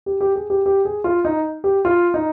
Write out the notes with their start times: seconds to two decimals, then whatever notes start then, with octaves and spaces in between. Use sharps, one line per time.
0.06 G4
0.21 G4
0.35 G#4
0.50 G4
0.66 G4
0.85 G#4
1.04 F4
1.25 D#4
1.64 G4
1.85 F4
2.14 D#4